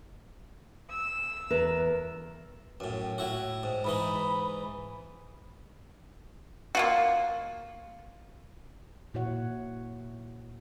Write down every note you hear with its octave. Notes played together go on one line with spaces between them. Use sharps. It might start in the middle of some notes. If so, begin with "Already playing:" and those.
E6
E2 A#4 B4
F#2 A2
A2 E4 F#4
G#2
G#2 E3 D#4 B5
A#3 F4 F#4
A#2 E4 F#4 C#5 F#5